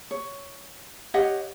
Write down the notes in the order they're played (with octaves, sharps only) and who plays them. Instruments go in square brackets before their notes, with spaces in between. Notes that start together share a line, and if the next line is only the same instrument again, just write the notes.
[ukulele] C#5
G4 C#5 D#5 F#5